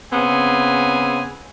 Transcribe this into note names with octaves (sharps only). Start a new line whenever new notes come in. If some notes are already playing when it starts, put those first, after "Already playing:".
C#3 B3 C4 G#5